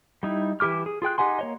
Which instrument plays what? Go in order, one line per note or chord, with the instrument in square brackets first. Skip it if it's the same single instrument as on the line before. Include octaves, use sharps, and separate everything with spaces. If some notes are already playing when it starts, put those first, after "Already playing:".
[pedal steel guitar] G3 D#4 E4
E3 E4 G4 D6 F6
G#4
F4 G#4 G5 F#6
D#4 G4 F#5 G#5 C6
A#3 C#5 D#5